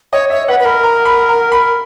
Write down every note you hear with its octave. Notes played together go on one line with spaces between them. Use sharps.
C#5 D#5
C#5 E5
B4 F#5
B4
A#4 B5
A#5
B5
A#5
B5